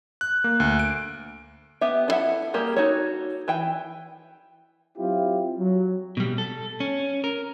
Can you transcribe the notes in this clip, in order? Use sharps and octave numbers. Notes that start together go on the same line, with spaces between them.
F#6
A#3
D2
D7
B3 G4 E5
D4 E4 A4 E5 F#5
G3 A#3 G4 G#4 A#4
D#4 F#4 A4 C#5
E3 G5
F#3 C4 E4 F4 G4
F#3
B2 G3
A4
C#4
A#4